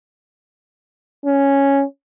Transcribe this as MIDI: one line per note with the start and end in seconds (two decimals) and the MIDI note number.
1.26 1.83 61